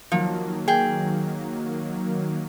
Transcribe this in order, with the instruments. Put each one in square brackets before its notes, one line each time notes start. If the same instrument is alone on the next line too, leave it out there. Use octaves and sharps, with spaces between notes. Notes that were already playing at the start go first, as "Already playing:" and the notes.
[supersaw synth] D#3 F#3 A#3 [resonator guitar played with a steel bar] F3
[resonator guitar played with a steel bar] G#4 G5